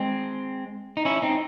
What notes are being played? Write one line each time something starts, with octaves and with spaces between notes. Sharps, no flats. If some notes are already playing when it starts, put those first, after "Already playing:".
Already playing: G#3 C4
D#4
C#4 E4
C4 D#4